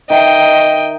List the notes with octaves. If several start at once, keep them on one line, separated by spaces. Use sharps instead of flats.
D#3 D#5 E5 G5 A#5